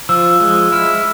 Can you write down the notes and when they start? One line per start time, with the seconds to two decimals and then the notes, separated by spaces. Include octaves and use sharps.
0.09 F3 E6
0.40 G#3
0.72 E4 F6